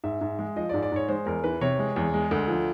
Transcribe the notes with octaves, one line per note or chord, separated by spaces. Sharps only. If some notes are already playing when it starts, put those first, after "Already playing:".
G#2 E5
G#2
G#3
F3 D#5
D5
G#2
D5
G#2 C#5
G#3 C5
E2 A#4
E3 B4
C3 C#5
G#3
E2
G#3
D2
F3